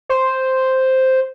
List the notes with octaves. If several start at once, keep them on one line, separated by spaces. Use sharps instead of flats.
C5